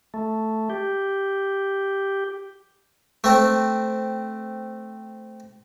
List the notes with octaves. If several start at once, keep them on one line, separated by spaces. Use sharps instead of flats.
A3
G4
A3 C4